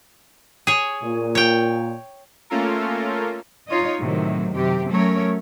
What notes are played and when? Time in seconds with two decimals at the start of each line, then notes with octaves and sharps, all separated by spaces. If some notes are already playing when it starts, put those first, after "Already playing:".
0.67 G#4 C#5
1.03 A#2
1.35 C#5 G5
2.50 A3 A#3 C#4 F4 A4 A#4
3.68 D#4 F4 C#5 D#5
3.99 A2 C3 D#3 F#3
4.54 F#2 C3 G4
4.89 F#3 A3 C#4 A#4 C#5